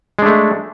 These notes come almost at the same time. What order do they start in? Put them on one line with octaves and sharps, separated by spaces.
G#3 D4 A3